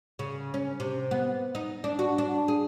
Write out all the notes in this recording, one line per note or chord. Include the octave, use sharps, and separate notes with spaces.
C#3
C#4
C3
B3
D#4
D4
F#4
D4
G#4